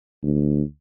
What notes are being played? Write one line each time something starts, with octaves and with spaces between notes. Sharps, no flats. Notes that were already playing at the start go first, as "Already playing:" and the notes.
D2